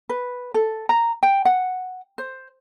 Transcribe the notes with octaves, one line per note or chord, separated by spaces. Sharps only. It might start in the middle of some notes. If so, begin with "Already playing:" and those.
B4
A4
A#5
G5
F#5
C5